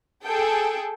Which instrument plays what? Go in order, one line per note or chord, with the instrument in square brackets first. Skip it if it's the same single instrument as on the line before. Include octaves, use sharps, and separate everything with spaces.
[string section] G#4 A4 G5